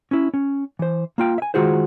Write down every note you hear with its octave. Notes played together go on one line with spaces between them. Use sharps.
C#4 E4
C#4
E3 C5
A#3 F4 G5
E5 G#5
D#3 G#3 F4 F#4 G#4 C5